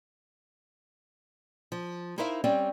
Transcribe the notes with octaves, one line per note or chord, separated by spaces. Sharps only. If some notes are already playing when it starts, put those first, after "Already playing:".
F3
D#4 E4 A#4 C5 E5 F5
G3 C4 C#4 D5